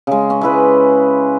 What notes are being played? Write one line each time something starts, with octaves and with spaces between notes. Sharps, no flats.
C#3 G#3
C#4
G#3 E4 B4